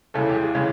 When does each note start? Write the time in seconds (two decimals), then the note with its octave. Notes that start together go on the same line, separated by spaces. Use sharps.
0.14 E2 C#3 E3 G#3 A4
0.29 G4
0.34 G#4
0.55 C#3 E3 G#3